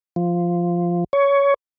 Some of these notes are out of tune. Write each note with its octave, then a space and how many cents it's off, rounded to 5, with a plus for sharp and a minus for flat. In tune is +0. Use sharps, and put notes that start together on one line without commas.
F3 -5
C#5 +15